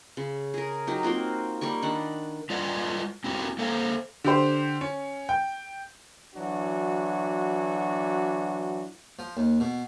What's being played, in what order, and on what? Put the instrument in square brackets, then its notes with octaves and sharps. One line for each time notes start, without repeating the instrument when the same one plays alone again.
[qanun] C#3
G#4 A#4
F#3 D#4 G4
A#3 C4 F4 F#4
G3 A#3 G4 C#6
D#3 D4 F#5 B5
[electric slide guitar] G3 F4 B4 D5 D#5 F#5
C4 E4 F#4 G4
A#3 A4 C5 F5
[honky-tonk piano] D3 G4 C5
C#4
G5
[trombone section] E3 F#3 D4 F#4
[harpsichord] F3
D#2
B2